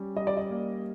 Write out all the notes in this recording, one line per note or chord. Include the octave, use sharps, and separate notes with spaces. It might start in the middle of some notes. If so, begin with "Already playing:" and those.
Already playing: G3 C#4
G3 D#5
D5
D#5
A#3